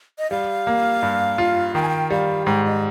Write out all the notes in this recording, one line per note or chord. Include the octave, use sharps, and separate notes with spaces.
D#5
G3 F5
A#3
G2
F4
D#3 G5
G#5
G5
G3 F5
G#2 G5
D#5